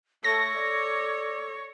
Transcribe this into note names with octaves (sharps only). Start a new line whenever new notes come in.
A3 A4 C#5 A#6
D5